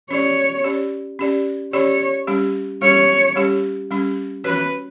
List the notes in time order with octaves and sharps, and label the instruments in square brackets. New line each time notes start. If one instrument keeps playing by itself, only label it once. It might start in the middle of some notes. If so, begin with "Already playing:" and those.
[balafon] C#4 G4 D5 [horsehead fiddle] C#5
[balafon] C#4 G4 D5
C#4 G4 D5
[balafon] C#4 G4 D5 [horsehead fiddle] C#5
[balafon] G3 C#4 G4
[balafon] G3 C#4 G4 [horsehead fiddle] C#5
[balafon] G3 C#4 G4
G3 C#4 G4
[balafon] C#4 F#4 C#5 [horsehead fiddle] B4